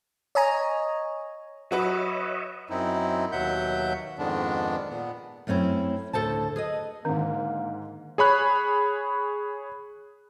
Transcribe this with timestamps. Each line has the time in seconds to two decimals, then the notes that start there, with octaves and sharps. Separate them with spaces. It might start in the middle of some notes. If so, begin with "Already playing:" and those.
0.35 C#5 D#5 G#5 A#5
1.71 F#3 F#4 B4 C#5 D#5 E5
2.70 F#2 C4 D#4 E4
3.32 D#2 B2 F#3 E5 F#5 G6
4.19 F2 G#2 D#3 G#3 B3 D4
4.88 A#2 B3
5.47 F#2 A3 C4 C#4 E4
6.13 D2 A2 A4 C5 A5
6.56 G#4 B4 D#5
7.05 G#2 D3 D#3 A#3
8.18 G#4 C#5 B5 F#6